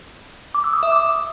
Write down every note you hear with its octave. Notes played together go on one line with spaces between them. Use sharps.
D6
E6
D#6
E5
D6